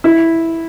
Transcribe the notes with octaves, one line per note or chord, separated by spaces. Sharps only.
E4